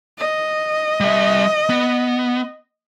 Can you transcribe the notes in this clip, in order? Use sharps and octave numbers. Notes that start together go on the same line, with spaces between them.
D#5
G3 E5
B3